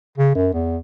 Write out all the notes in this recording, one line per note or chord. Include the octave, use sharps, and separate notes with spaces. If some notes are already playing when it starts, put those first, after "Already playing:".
C#3
F#2
E2